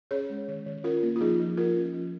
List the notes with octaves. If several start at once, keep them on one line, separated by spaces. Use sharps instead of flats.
C#4 G#4 C#5
G#3
D#3
D#3
C#4 F4 A#4
A#3
F4
F3 D#4 G#4
F3
F3 F4 A#4
C#4
F3